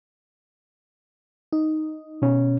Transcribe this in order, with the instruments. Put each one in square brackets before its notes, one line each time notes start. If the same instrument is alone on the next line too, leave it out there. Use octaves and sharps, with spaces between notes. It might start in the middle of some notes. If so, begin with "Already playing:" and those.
[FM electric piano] D#4
[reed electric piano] B2 C#4